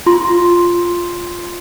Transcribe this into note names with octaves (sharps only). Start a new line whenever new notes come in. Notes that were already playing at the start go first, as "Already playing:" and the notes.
F4 C6